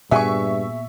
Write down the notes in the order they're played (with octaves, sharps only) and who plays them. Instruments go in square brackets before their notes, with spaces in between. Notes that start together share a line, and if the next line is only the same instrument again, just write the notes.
[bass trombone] G2 [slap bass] A#2 B3 [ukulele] F#4 G#4 G#5 [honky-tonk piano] E5 C#6